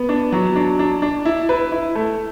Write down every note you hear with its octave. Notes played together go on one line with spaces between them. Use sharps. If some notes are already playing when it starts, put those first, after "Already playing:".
Already playing: B3
D4
F#3
D4
D4
D4
E4
B4
E4
A3